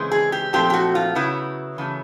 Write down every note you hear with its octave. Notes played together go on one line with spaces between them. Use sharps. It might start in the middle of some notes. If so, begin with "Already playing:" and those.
Already playing: C#3 E3 G#3 C4
G#4
G4
A#2 F3 A3 C4 G4
G4
F#4
F4
C#3 F#3 B3 E4
C#3 E3 A3